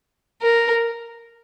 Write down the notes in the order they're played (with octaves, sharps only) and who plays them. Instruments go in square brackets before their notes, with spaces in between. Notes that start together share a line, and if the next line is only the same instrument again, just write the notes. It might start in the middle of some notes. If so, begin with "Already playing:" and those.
[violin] A#4